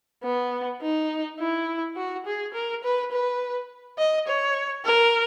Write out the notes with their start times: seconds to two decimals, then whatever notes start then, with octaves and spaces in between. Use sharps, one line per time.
0.23 B3
0.81 D#4
1.39 E4
1.96 F#4
2.26 G#4
2.54 A#4
2.83 B4
3.12 B4
3.98 D#5
4.27 C#5
4.85 A#4